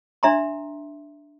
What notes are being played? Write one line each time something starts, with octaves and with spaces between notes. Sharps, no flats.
D4 E5 A#5 C6